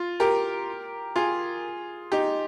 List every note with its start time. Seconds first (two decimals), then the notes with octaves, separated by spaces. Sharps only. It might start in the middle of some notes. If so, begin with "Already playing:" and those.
Already playing: F4
0.20 G4 A#4
1.16 F4 G#4
2.12 D#4 G4